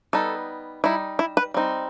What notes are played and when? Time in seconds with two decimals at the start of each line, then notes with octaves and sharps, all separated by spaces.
0.13 G3 B3 D#4 A4
0.84 G3 D#4 E4
1.19 E4
1.37 B4
1.54 G3 C4 D#4